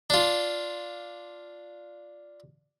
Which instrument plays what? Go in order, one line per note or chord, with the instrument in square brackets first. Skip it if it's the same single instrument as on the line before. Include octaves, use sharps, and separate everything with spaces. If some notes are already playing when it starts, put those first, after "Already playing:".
[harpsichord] D4 F4